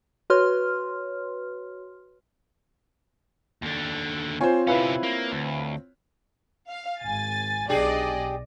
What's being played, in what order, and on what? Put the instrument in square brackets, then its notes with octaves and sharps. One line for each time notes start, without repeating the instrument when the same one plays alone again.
[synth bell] F#4 B4 C#5 C6 F6
[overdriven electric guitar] D#2 D3
[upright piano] C4 F4 C#5 [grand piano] C5 G#5
[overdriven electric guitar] C3 C#4 [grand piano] E4 B4 F5
[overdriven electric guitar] A#3
D2
[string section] F5
G#1 G#5 A6
[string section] B1 D5 D#5 [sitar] D4 G4 G#4